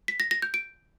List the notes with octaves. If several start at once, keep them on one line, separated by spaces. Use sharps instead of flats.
B6
A#6
A#6
G6
D7